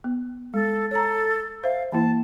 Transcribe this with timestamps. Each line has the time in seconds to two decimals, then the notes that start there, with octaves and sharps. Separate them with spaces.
0.04 B3
0.54 G#3 A4
0.91 A4 C#5 A#5
1.64 C5 E5 F5
1.92 E3 A#3 E4 A5